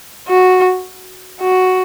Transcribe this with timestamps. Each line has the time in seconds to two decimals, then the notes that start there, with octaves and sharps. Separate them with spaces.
0.28 F#4
1.41 F#4